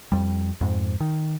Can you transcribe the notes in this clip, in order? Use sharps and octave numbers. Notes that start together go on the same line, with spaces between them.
F2 G3
F2 G#2
D#3